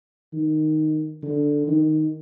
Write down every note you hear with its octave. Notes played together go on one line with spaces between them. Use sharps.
D#3
D3
D#3